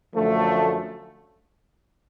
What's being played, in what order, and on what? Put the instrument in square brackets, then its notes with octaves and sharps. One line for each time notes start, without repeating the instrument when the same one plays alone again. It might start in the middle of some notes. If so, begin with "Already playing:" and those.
[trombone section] F#2 D3 F3 A3